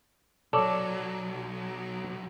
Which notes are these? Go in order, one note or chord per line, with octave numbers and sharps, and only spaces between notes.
B1 F#3 A4 C#5 D5